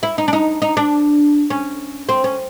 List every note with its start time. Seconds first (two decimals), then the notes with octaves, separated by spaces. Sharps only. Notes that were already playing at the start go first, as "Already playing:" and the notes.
0.03 E4
0.18 D#4
0.28 D4
0.33 D#4
0.62 D#4
0.77 D4
1.50 C#4
2.09 C4
2.24 C#4